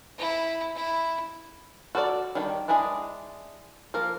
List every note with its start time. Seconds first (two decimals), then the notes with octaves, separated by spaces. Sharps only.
0.19 E4
0.75 E4
1.95 F#4 A4 A#4 C5 D5
2.35 D#3 G3 D4 G5
2.68 G#3 D4 E4 G#4 D#5
3.94 F3 A#3 A#4